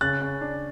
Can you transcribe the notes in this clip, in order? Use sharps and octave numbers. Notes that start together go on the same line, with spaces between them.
C#3 F#6 A6
C#3
D4